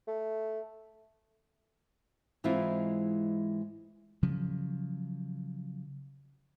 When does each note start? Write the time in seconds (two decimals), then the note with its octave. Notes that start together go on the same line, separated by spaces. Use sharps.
0.08 A3
2.44 G#2 E3 G#3 C4 E4 F4
4.23 C#3 F3 F#3